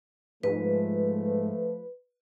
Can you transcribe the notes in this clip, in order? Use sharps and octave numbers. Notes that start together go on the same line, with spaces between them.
G#2 F3 A3 B4